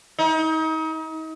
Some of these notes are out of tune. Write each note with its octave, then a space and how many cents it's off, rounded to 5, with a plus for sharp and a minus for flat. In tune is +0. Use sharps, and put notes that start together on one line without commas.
D#4 +35